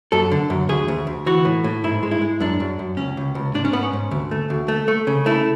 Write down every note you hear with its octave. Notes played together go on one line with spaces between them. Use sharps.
F#2 A4
D3
F#2
D2 G#4
D2
D2
E3 F#4
A2
A2
G#2 E4
G#3
E4
G#3
F#2 D4
F#2
F#2
C#2 C#4
C#2
C#2
G#2 D4
C#4
G#2 B3
C#4
G#2
D2
A3
D2
A3
A3
C#3
A3 E4